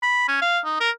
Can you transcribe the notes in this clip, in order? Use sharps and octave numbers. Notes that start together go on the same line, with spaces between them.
B5
C#4
F5
D#4
A#4